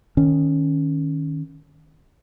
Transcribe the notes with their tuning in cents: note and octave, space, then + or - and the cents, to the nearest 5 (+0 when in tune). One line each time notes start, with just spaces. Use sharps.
D#3 -5 C#4 +0